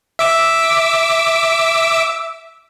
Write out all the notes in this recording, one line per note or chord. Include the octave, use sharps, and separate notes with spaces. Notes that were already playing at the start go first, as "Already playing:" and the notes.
E5 D6 E6